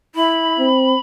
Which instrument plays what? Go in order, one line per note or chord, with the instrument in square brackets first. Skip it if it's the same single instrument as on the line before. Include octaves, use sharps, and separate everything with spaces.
[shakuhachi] E4 [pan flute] B5
[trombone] C4